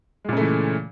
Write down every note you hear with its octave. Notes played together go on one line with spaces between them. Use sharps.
A#2 C#3 E3 G#3 A3